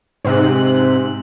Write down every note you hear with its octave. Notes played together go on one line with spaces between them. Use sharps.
G#2 C3 F#6